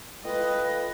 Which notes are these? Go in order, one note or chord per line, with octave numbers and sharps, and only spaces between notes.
F4 A4 B4 D#5 F5 G5